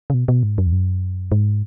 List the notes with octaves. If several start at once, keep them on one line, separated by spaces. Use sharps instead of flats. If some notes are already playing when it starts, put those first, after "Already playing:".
C#3
B2
B2
G#2
F#2
E2
F#2
G#2